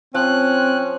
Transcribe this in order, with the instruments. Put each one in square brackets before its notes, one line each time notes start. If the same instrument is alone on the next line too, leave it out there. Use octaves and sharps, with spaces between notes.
[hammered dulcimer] F3 [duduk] C4 [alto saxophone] C#4 [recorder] F#6